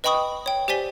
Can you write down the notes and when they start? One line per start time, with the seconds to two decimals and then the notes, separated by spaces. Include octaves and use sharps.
0.04 B4 D#5 G5 B5 C#6 D#6
0.46 C#5 G5
0.68 G4 C5 D5 G#5 B6 G7